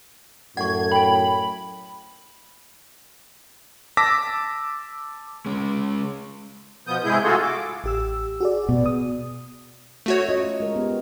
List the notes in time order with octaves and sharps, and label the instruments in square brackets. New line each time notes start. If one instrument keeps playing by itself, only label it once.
[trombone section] F#2 A2 A3 [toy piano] F#5 C#6 [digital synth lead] G#6
[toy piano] G5 G#5 [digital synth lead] B5
[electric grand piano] A5 D6 E6 A#6 B6
[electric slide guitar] G#3 C#4
[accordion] B2 F3 B3 D#6 G6
G#2 C3 G#3 E4 G#4 G6
A3 F4 F#4 G#4 A4
D6
[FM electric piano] A1 G4 E6
F#4 G#4 D5
[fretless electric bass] B2
[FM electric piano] D#6
[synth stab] A3 F#4 C#5
[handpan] C#4 F4 D#5
G#3 A#4
B3 G4